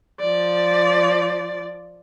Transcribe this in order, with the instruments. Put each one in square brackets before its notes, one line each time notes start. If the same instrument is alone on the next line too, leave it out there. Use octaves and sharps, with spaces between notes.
[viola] F3 D5